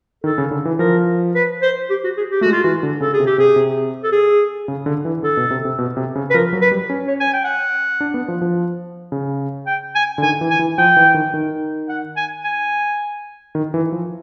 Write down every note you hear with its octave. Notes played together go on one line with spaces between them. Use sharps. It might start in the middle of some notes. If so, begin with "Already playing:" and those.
D#3 A4
C#3
D3
E3
F3 A#4
B4
C5
G4
F#4
G#4
G4
G#3 A3 F#4
F4
E3 F#4
D3
C#3 A4
G#4
C3
G4
C3 G#4
C3
A4
G#4
C#3
D3
E3
D3 A4
B2
C3
C3
B2
C3
C#3
B4
F3 A#4
F#3
B4
G3
C#4
C#5
G#5
G5
F#5
D4
B3
F3
F3
C#3
G5
G#5
D3
D#3 G#5
E3
G#5
E3
F3 G5
E3
D#3
D#3
F#5
G#5
G#5
D#3
E3
F3